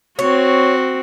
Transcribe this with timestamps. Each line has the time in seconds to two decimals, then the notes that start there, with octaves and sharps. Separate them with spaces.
0.19 C4 F#4 C#5